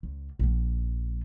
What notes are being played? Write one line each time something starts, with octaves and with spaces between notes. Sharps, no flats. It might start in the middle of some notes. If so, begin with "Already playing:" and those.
C#2
A#1 F3